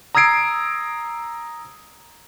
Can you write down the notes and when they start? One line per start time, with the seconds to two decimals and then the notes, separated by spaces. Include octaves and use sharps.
0.15 A#5 D#6 E6 G#6 C7 D7